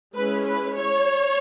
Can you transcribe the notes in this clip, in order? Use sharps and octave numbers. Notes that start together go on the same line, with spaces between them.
G#3 C#4 E4 B4
B4
C#5